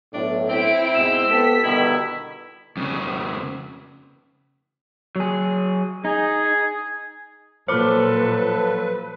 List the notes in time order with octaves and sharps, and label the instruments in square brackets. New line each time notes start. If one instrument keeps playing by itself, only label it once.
[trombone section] B1 A2 [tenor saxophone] D4
[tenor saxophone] C4 [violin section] E4 D7
[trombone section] G#2 B2 [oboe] E6
[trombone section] B3 G4 A4 [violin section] B6
[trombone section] B2 D#3 G3 [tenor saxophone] D3 [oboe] E4
[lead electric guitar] F2 C#3
[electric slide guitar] F#3 G#4
[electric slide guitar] D#4 [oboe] G#4
[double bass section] A#2 [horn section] F3 F#3 A4 [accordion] B4 [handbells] C5 D6